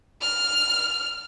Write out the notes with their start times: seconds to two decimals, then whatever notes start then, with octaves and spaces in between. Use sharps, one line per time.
0.22 F6